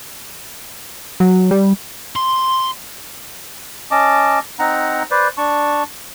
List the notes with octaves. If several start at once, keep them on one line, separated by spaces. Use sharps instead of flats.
F#3
G3
C6
C#4 D#5 A5 D6
C4 D#4 F#5 A#5
B4 C5 D5
D4 A5 C#6